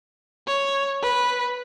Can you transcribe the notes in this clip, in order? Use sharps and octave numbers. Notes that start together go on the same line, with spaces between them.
C#5
B4